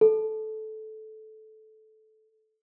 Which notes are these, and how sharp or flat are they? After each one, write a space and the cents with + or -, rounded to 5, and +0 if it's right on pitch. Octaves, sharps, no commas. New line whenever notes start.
A4 -15